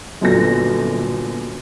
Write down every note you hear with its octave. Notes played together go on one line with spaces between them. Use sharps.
G1 F#2 A#2 A4 A#6